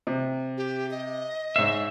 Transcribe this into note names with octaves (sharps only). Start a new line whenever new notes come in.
C3
G4
D#5
G#2 C#5 E5 C7